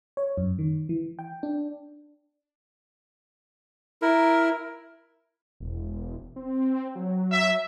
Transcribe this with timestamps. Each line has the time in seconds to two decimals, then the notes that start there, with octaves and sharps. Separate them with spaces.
0.17 C#5
0.37 F#2
0.59 D#3
0.89 E3
1.19 G5
1.43 D4
4.02 E4 A#4
5.60 E1
6.36 C4
6.95 F#3
7.32 E5